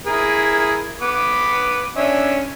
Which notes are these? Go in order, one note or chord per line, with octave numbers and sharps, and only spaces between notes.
E4 G#4 A#4
B3 B4 D6
C#4 D4 E5